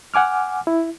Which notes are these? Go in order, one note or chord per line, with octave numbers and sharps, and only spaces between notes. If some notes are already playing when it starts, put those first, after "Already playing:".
F#5 G#5 D6 F6
E4